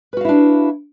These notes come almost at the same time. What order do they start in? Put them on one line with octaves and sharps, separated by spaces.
B4 F#4 F5 E4 D4